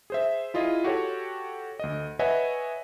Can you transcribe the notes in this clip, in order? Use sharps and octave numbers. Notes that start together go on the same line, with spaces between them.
G#4 C5 E5
E4 F4 G#4 D#5
F#4 G4 A4 C#5 G5
D2 D#5
B4 C#5 D#5 E5 F#5 G#5